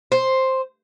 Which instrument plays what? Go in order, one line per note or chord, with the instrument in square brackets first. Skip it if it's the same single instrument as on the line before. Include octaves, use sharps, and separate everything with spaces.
[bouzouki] C5